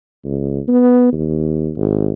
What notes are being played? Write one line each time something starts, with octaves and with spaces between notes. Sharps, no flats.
C#2
B3
D#2
G#1